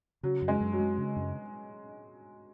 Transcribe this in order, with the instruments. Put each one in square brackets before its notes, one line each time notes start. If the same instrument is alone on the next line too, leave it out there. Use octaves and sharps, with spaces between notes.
[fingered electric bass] C#3 [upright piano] F#3
[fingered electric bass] F#2
[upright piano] G#3
[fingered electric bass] F#2
[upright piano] F#3
[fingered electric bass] G#3
C#3
F#2